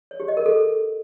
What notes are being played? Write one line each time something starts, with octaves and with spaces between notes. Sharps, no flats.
C#5
G4
D#5
A#4
A4